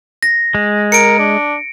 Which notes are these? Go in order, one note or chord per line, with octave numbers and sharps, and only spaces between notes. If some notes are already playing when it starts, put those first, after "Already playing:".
A#6
G#3
A#4 C#7 D7
D4